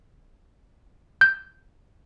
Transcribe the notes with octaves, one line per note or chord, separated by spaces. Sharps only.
G6